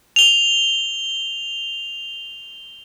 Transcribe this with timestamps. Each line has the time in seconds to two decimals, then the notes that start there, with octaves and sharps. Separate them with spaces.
0.16 F7 G7